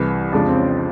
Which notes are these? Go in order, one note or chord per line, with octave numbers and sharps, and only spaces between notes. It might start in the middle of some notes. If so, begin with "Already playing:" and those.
Already playing: C2 C3 E3 G#4
F2 C#3 F3 G#3 D4
C4
C#4